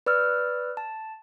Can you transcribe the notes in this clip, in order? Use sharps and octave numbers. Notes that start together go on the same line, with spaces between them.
B4 D5 E6 F6
A5